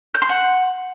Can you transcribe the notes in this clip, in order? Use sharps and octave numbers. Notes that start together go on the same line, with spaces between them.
G6
C6
F#5